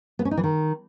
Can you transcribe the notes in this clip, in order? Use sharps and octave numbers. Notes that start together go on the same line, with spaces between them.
B3
C#4
D#4
E3
D#3